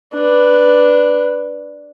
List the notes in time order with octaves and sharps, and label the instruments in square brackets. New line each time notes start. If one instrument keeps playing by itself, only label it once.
[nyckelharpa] D4 B4